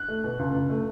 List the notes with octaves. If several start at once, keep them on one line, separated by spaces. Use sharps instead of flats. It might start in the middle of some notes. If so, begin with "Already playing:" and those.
Already playing: F#6
A3
B2
C#2
C#2
A3